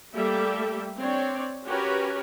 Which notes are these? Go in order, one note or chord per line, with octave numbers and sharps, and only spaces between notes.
G3 A3 A#3 G4 A4 E5
C4 D4 C#5 D5
C#4 F#4 G4 A#4 B4 C#5